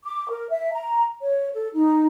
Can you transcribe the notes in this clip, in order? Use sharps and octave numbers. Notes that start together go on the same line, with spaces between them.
D6
A#4
E5
A#5
C#5
A4
D#4